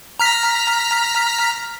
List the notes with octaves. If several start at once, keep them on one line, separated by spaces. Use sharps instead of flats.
A#5 F6 B6